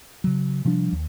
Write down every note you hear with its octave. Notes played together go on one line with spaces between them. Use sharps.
C#3 F#3
C3 F3 G3 D4
D#2